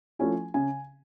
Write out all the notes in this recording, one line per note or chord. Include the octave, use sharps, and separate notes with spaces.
F3 A3 C#4 E4 G#5
C#3 G#5